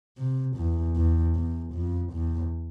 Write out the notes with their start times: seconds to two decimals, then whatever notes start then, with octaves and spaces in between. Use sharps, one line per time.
0.18 C3
0.56 E2
0.95 E2
1.35 E2
1.73 F2
2.12 E2